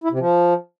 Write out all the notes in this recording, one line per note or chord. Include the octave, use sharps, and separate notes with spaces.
E4
C3
F3